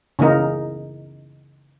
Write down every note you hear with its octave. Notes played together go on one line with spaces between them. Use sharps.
C#3 E3 A#3 D#4 A#4